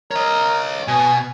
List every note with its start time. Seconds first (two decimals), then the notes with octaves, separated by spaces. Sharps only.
0.11 A#4 C#5 D#5
0.88 B2 G#5